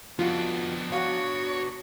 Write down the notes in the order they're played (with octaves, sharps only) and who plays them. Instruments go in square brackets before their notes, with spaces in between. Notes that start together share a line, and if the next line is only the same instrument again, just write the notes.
[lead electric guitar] F2 [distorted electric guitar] B3 D4 [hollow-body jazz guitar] F4 F#4
[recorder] F#4 [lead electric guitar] C#5 [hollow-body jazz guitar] F5 F#5